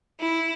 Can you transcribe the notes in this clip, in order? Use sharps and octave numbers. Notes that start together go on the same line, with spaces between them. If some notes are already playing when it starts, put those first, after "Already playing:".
E4